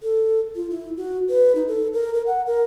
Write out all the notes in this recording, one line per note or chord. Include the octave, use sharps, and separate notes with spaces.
A4
F4
E4
F#4
B4
D#4
A4
A#4
A#4
F#5
A#4